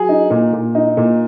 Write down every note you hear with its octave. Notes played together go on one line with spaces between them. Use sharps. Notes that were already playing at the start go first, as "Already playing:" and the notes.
Already playing: F#3 G#4
D#4
A#2
A#2
D#4
A#2